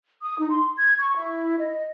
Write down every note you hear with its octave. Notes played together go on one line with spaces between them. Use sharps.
D#6
D#4
C6
G#6
C#6
E4
D#5